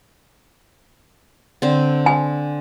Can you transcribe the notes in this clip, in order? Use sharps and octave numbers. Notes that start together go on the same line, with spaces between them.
D3 C4
G#5